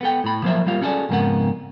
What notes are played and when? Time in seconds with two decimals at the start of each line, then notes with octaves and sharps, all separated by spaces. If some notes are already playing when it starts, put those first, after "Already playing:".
0.01 B3 A4 G5
0.24 A2 B5
0.43 F3 F#3 A#3 A#4 C5 E5
0.66 G3 A#3 F4 F5
0.82 C#4 F#4 G#4 A4 D5
1.09 F2 G#2 C#3 A#3 B3 F#5